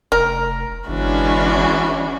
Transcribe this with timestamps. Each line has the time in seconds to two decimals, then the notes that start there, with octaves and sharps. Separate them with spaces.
0.12 F1 A#4
0.88 G1 E3 G#3 C#4 D4 F#4